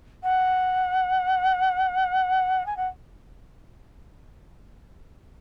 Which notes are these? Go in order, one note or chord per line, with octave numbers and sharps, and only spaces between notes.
F#5
G#5
F#5